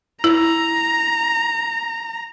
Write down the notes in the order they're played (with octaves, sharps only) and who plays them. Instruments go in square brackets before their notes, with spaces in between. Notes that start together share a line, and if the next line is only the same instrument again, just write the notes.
[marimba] E4 [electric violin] A#5